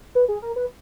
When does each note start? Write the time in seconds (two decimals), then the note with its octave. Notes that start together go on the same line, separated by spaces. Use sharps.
0.15 B4
0.28 G#4
0.42 A#4
0.56 B4